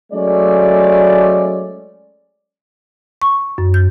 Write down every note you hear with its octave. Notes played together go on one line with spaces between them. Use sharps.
F#3 G#3 A3 C#4 D5
C#6
F#2
G6